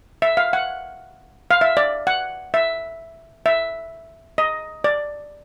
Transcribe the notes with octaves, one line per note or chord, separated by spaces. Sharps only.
E5
F5
F#5
F5
E5
D5
F#5
E5
E5
D#5
D5